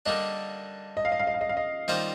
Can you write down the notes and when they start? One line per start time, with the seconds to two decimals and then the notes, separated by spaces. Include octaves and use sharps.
0.06 D3 G3 A#3 D4 D#5
0.97 D#5
1.05 F5
1.12 D#5
1.19 F5
1.27 D#5
1.34 F5
1.41 D#5
1.49 F5
1.57 D#5
1.88 D#3 G3 A#3 F4 C5 D#5